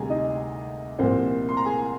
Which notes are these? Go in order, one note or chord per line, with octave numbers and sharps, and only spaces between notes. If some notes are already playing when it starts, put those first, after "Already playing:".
Already playing: D2 C3 G3 D4 G#4 G#5 A#5
D#4 D#5
C2 A#2 F3 A#3 C4 C5
C6
A#5
G#4 G#5